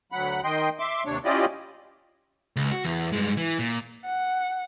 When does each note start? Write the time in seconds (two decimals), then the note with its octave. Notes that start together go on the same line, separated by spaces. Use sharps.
0.12 D2 F#3 F#5 B5
0.44 D#3 D#5 G5 C6
0.80 E5 C6 D6
1.05 D#2 C3 D4 C#5
1.25 C#4 E4 F4 G4 D5 D#5
2.56 C#2
2.71 F#4
2.85 E2
3.12 G2 G#3
3.37 E3
3.59 A#2
4.06 F#5